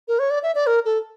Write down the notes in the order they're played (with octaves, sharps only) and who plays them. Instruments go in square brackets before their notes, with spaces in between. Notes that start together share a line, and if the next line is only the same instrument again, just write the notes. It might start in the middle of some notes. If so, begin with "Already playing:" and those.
[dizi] A#4
C#5
D5
E5
D5
A#4
A4